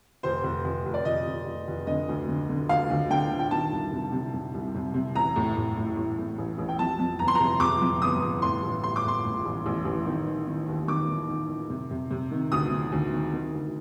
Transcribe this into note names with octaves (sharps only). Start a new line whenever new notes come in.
F1 C5
F1
F1
F1
D5
F1 D#5
F1
F1
F1
D3 D#5
D2
D3
D3
D2 F5
D2
D3 G5
D3
G5
D#3 A5
C2
C3
C3
C3
C2
C3
C3
A1 A#5
A2
A2
A2
A2
A2
A1
A1
G5
F2 A5
F2
G1 A#5
C6
C3 A#5
C3 D6
F2
G1 D#6
G1
A2 C6
A1
A2 C6
D6
A2 C6
A2
A1
A1
A1
D#3
D#3
D#3
D#2
D#3 D6
D#3
D#3
D#3
C3
C3
C3
D#3
D2 D#6
D#3
D2
D#3
D#3
D2